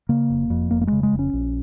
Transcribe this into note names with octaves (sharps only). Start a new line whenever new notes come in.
C#3 A#3
F1
F2
F1 A#3
A#3
C#3 G#3
G#3
F1
C#4
A#1